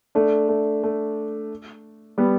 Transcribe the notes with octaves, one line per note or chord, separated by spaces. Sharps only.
A3 D4
A3
A3
G3 B3